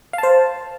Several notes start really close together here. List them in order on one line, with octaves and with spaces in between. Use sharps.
F5 A5 C5